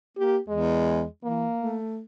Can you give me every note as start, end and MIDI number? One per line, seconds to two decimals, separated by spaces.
0.17 0.39 58
0.17 0.37 67
0.48 1.04 40
0.48 1.04 56
1.24 1.48 52
1.24 1.76 58
1.59 2.01 57